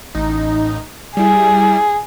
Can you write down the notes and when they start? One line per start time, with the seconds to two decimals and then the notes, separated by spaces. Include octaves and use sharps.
0.15 A1 D#4
1.17 G3 E4 G#4